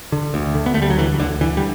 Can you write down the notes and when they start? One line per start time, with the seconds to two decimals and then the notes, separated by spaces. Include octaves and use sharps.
0.12 D3
0.34 D2
0.55 D3
0.66 B3
0.74 A3
0.77 D2 G3
0.90 F#3
0.98 D3 E3
1.20 D2 D3
1.41 D3 E3
1.57 G3